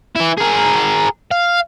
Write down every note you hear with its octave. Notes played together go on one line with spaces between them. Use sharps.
E3 E4
G#4 A#4
F5